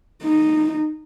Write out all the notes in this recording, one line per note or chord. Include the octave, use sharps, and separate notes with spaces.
D#4